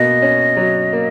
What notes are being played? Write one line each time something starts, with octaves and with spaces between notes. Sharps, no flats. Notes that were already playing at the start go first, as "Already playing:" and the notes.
Already playing: B2 A#3 D#5
C#4
F#3
A#3